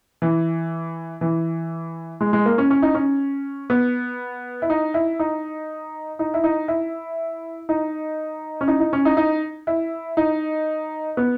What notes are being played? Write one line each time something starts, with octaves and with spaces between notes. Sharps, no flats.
E3
E3
G#3
G#3
A#3
C#4
C#4
D#4
C#4
B3
E4
D#4
E4
D#4
D#4
E4
D#4
E4
D#4
C#4
D#4
D#4
C#4
D#4
D#4
E4
D#4
B3